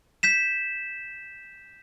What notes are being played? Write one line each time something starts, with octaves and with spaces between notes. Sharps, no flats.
G6 B6 E7